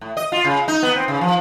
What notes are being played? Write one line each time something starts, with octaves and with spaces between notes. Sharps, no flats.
A2
D#5
F4
C#3
D#4
B3
C4
C#3
F3